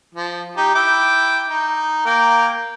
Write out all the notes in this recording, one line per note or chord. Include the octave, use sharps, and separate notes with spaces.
F3
D#4 G4
E4 G5 D6
D#4
A#3 A#4 G5